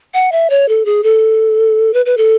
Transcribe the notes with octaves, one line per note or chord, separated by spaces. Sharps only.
F#5
E5
C#5
A4
G#4
A4
B4
B4
A4